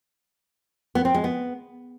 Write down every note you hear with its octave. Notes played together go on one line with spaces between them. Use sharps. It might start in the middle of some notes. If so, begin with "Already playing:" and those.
B3
C4
G#3
B3